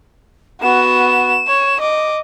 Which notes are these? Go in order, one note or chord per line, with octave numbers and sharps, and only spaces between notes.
B3 F#4 E7
C#5
D#5 D6